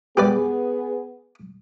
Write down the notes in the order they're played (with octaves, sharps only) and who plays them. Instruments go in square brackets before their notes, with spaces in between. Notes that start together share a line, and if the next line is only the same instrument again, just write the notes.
[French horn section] B3 G#4 [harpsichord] G4 B4 D5